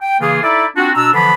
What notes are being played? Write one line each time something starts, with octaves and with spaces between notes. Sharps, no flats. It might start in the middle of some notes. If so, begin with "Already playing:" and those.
G5
C#3 E3 A#3 F4 G#4
D#4 E4 A4 D5 E5
C4 D4 F4 F#4
B2 D4 A#5 E6
D3 E3 F3 B3 D4 B5